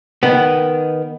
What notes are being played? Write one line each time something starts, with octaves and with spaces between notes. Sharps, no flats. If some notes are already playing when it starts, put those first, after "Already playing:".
D#3 B3